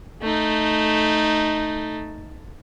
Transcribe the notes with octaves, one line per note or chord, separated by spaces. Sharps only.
A3 D#4